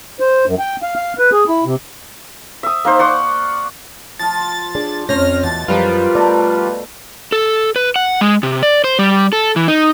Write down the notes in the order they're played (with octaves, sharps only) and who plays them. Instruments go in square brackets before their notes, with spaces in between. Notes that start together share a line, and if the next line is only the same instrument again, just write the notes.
[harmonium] C5
F#2
G5
F5
F5
B4
G#4
E4
C3
[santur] E5 D#6
A#3 D#4 C5
D5 F#5 C6 C#6
[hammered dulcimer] F3 F4 [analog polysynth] A6
[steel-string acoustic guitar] D4 G#4 D5
[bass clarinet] F2 [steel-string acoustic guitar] C4 C#4 C#5 [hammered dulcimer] C5 [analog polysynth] F6 A#6
[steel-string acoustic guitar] E2 [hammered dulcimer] B2 [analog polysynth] A6
[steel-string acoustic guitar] F#2 [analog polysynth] F3 G3 F4 [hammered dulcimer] A#4 [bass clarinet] B4
[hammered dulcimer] B2 A3 A#5 [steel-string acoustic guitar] D5
[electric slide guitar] A4
B4
F#5
G#3
C3
D5
C5
G3
A4
E3
D#4